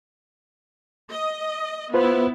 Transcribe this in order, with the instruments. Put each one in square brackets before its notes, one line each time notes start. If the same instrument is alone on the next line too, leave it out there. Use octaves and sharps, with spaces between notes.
[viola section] D#5
[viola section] B3 E4 [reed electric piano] F4 B4 C5